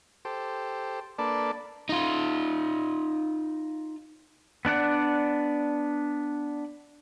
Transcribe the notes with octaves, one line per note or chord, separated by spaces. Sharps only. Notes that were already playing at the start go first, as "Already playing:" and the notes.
G4 A4 C5
A#3 D4 A4 B4 D5 A5
D#4 F4
B3 D4 D5 F#5